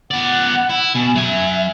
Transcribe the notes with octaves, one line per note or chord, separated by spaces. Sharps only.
B3 D5 F#5
E4
B2 G#5
F#3 E5 G#5